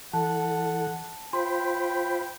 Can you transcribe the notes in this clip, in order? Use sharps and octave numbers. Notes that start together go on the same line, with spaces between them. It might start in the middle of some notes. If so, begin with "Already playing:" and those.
E3 A4 F#5 A5
F4 C5 G5 B5 C6